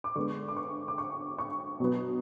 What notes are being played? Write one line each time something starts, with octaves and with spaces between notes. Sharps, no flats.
D6
D3 G#3 B3 C#6
D6
C#6
D6
C#6
C#6
B2 F#3 B3